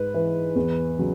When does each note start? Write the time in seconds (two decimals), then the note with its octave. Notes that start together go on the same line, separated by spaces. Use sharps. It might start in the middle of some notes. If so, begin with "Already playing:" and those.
Already playing: G#2 B4
0.14 E3
0.56 E2
0.98 C#3 F#3